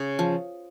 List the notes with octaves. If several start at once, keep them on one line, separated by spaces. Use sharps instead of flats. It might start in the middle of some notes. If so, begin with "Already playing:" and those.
Already playing: C#3
F3